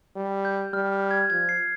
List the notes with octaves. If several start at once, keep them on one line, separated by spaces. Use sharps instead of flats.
G3
G6
G3 F6
F6
G#6
F3 G#6
C7